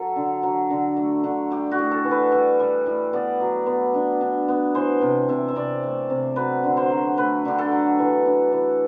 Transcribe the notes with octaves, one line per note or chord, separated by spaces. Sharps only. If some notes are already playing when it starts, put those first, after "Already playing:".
Already playing: F#3 A4
D3
F#3
D3
A3
D3
G3 G4
F#4
A2
A4
E3
B4
G3
G3
A2
B3 D5
F#3
B3
D4
D4
B3
E3 C5
C3
C3 E5
E5
C3 D5
A3
C3
F#3 B4
D3
C5
F#3
A3 B4
D3 G4
A4
F#3
E3
D4
E3